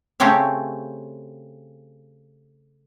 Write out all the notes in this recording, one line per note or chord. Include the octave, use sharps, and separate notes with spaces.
C#3 A3 C4 G4 C#5 F5